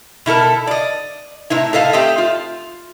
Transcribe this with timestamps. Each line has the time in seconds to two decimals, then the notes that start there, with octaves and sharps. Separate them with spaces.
0.26 B2 E4 A4 A#4
0.67 D5 D#5
1.50 A2 C3 D#4 E4
1.73 A2 A4 D#5 F5
1.93 A3 C4 G4 D#5 E5
2.18 F4